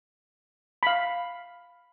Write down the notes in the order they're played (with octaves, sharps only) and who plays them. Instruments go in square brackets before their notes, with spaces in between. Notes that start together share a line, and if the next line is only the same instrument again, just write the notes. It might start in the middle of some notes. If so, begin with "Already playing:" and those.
[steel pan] F5 B5